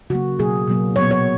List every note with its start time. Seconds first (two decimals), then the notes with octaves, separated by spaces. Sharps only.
0.10 C#3 F#3 A#3 F#4
0.39 B2 F#3 A#3 G#4
0.67 B2 F#3 A#3
0.96 A#2 F#3 B3 C#5
1.11 C#5